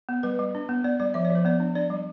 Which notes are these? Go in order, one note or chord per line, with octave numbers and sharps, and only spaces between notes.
B3
G3 B4
G3
D4
B3
B3 D5
G3 D5
F3 E5
D5
F3
C5
B3 D5
D4
D4 D5
G3